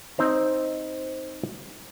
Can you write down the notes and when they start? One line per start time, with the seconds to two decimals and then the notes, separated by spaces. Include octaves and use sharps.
0.18 C4 D#4 C5 A#5